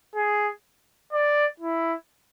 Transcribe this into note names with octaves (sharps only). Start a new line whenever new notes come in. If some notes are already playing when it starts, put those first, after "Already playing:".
G#4
D5
E4